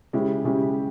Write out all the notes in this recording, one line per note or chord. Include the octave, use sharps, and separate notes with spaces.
C#3 G#3 C#4 E4 G4
C#3 G#3 C#4 E4 G4